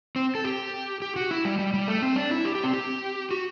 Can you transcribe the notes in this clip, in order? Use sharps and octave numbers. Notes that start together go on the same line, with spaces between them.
C4
A4
G4
G4
F#4
E4
G3
G3
G3
A3
C4
D4
E4
G4
G4
C4
G4
F#4